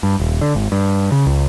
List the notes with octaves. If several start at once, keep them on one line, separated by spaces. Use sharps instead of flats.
G2
D#1
D3
G#1
G2
C#3
C#2